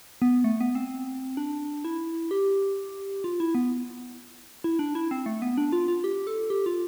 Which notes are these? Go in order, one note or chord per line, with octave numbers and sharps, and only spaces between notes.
B3
A3
B3
C4
D4
E4
G4
F4
E4
B3
E4
D4
E4
C4
A3
B3
D4
F4
F4
G4
A4
G4
F4